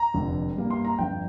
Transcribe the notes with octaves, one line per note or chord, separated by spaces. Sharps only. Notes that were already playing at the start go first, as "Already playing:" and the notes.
Already playing: A#5
F1 F2 D3
G2 G3 A#3
C6
A#5
G1 F2 F3 D4 F4 G5